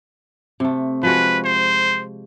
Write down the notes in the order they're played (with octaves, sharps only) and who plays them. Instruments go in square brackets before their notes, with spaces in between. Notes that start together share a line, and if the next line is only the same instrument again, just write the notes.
[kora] C3 A3
[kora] F3 G#3 F#4 [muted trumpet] B4
[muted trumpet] C5